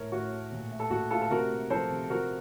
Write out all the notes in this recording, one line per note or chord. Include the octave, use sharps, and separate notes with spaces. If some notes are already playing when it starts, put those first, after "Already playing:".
Already playing: A2 A3 A#4 C#5
A2 F#4
A3
A#2
A3
A4
A#2 F#4
A3 F4 A4
A4
C3 F#4 A#4
A#3
F3 A4 C5
C3
F3 F#4 A#4